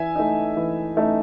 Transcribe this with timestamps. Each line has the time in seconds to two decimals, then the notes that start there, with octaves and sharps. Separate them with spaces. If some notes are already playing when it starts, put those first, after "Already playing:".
Already playing: E3 E5 G#5
0.16 A3 D#4
0.57 E3
0.97 A3 D#4